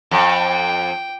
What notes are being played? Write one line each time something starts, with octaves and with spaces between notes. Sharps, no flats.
F2 G5